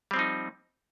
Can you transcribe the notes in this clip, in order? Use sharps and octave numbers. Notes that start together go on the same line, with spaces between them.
F3 G3 C4 D#4